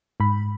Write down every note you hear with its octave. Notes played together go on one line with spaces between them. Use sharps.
G#2 B5